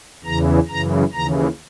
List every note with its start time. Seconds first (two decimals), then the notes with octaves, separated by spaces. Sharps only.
0.24 E2 C#3 E3 A#5
0.68 F#2 C#3 E3 A#5
1.13 D#2 C#3 E3 A#5